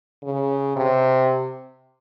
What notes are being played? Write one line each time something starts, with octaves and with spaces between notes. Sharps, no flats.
C#3
C3